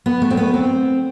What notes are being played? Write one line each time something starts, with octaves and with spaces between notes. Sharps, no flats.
B3
A3
C4
B3
C4